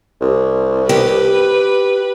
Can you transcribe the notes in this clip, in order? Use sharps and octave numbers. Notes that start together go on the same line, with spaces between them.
C2
G4 B4